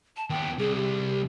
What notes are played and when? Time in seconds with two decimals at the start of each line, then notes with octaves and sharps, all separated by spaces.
0.17 A5
0.30 D#2 B3 G5
0.59 C2 G#4
0.75 G4